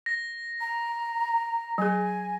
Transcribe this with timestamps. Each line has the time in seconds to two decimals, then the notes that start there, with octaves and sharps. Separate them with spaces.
0.06 A#6
0.61 A#5
1.78 F#3 G#4 G#5